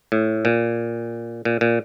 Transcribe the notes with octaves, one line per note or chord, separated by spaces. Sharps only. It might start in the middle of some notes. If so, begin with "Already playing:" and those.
A2
A#2
A#2
A#2